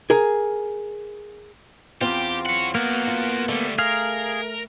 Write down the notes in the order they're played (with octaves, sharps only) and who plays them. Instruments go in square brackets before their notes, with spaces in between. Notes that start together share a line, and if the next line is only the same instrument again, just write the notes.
[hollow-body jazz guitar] G#4 A#4
[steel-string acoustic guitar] E2 C4 F4 [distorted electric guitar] G4
[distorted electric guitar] C#5 F#5
[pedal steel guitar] A#3 B3 [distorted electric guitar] F#4 A#4
[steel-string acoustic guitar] F4
[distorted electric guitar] D3 G3 [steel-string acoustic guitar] A3
[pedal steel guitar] G#4 F5 [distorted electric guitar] A#4